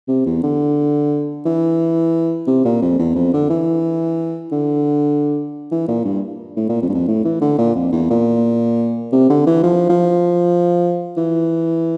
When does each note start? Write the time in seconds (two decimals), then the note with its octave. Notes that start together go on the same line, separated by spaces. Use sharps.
0.08 C3
0.26 E2
0.43 D3
1.46 E3
2.47 C3
2.65 A#2
2.82 F2
2.99 E2
3.15 F2
3.33 D3
3.50 E3
4.52 D3
5.71 E3
5.88 A#2
6.05 G2
6.57 A2
6.69 A#2
6.82 F2
6.89 G2
6.94 F2
7.08 A2
7.25 E3
7.41 D3
7.59 A#2
7.75 F2
7.92 E2
8.10 A#2
9.12 C3
9.30 D3
9.47 E3
9.63 F3
9.89 F3
11.17 E3